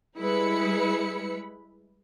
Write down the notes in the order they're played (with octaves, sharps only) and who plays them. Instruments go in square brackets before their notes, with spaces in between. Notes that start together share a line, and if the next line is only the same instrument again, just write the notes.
[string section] G3 G#3 E4 B4 B5 C#7